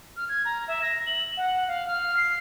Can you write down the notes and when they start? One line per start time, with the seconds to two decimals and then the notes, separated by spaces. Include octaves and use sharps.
0.17 F6
0.29 G#6
0.45 A#5
0.68 E5
0.82 A#6
1.07 F#7
1.37 F#5
1.68 F5
1.87 F6
2.17 C7